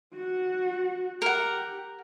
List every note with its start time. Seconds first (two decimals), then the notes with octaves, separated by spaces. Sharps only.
0.14 F#4 F#5
1.22 G4 A#4 F#5